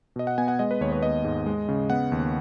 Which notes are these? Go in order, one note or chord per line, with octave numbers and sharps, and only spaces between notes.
B2 D#5
F#5
B3 G#5
F#5
G#3 D#5
B4
D#2 C#5
C#5
B3 D#5
G#2
G#3
C#3
B3 F#5
D#2